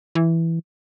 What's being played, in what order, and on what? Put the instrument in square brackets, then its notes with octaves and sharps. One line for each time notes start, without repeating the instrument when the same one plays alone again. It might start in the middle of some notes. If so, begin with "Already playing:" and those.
[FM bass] E3